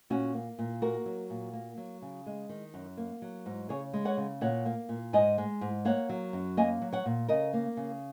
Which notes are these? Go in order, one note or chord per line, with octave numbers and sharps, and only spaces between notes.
A#2 C#4 F#4
A#3
A#2
A#3 F#4 A#4
F#3
A#2
A#3
F#3
C#3
G#3
D#3
F#2
A#3
F#3
G#2
C#3 G#4 C#5
G#3
C#5 F#5
C#3
A#2 C#5 F#5
A#3
A#2
G#2 D#5 G#5
G#3
G#2
A#3 C#5 F#5
F#3
F#2
A#3 D#5 G#5
F#3
C#5 F#5
A#2
C#3 A#4 D#5
A#3
C#3